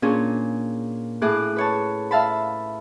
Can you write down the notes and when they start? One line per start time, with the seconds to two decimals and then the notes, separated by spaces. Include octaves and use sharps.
0.02 A#2 C#4 D4 G#4
1.22 A2 G#4 D6 F#6
1.56 B4 C#5 A5
2.11 E5 F5 A5 B5